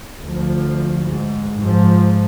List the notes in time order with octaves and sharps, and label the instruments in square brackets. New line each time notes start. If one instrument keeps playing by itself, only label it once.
[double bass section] D2 F3
G#2
G#2 F3